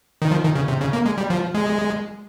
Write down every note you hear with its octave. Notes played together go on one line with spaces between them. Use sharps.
D#3
F3
D#3
C#3
C3
C#3
A#3
G#3
G3
F3
G#3